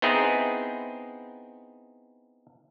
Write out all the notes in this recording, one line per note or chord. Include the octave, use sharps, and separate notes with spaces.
B3 C4 D#4 E4 G#4